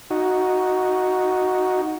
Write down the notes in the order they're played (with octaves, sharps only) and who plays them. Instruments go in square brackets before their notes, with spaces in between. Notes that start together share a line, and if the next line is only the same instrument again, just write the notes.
[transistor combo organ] D#4 F#4